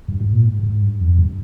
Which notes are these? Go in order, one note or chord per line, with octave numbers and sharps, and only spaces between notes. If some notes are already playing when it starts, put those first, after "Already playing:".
G2
G#2
A#2
G#2
G#2
G2
F2
G2